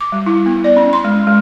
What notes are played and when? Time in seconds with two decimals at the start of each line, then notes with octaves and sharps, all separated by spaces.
0.01 D6
0.12 G3
0.26 E4
0.46 B3
0.64 D5
0.77 C#4
0.93 C6
1.04 G#3
1.27 G#3